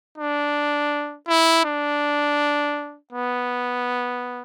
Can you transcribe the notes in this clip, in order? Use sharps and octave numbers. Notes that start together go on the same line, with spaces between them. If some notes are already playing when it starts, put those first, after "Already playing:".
D4
E4
D4
B3